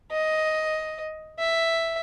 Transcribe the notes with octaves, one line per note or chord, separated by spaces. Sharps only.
D#5
E5